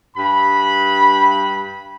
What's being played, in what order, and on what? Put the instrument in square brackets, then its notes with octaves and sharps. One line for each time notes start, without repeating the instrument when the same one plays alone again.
[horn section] G2 B5